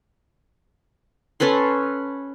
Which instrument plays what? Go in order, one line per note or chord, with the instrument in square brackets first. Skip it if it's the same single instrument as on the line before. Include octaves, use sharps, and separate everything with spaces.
[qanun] C#4 A4 B4 C6